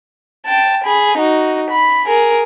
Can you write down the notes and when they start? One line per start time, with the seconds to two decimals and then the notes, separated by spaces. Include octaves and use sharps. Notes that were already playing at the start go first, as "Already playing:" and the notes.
0.46 G5 A5
0.84 G#4 B5
1.18 D#4 F#4
1.70 B5
2.05 G#4 A#4